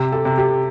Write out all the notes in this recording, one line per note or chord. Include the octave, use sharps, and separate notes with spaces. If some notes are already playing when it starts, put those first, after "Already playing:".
Already playing: C3 G4
A4
C3
G4